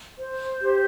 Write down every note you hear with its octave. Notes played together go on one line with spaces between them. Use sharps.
C5
G4